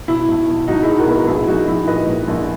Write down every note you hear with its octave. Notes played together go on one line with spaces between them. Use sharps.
B2 E4
B1
B2
B1 D#4 F#4
E4 G#4
B2
F#4 A#4
B2 B4
F#4 A#4
A#1 E4 G#4
A#1 D#4 F#4
A#1 E4
A#2 B4 D#5
A#1
A#1